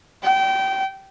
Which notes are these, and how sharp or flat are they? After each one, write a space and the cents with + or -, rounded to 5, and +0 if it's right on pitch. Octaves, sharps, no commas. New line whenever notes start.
G5 -25